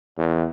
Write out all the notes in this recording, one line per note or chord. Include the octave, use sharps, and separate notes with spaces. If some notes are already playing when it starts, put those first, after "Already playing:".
E2